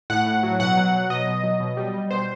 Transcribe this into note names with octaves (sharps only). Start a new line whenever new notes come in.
A2 F#5
A2
F#3
B2 F#5
F#3
F#3
B2 D#5
B2
F#3
B2
G3
G3
B2 C5